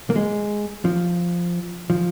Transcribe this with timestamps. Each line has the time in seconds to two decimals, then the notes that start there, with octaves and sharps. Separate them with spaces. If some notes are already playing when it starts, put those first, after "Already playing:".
0.10 A#3
0.16 G#3
0.85 F3
1.90 F3